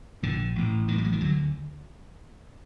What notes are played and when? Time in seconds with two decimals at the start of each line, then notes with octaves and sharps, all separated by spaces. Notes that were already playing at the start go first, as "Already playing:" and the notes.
0.23 A#1 A#2 D3
0.55 A1 A2
0.87 A2 D#3
0.92 A1
0.98 G3
1.04 F#3
1.12 D#3
1.20 D2 D3 F#3